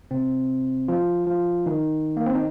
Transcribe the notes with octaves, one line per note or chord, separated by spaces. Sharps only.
C3 C4
F3 F4
F3 F4
D#3 D#4
A#3
C4
D#4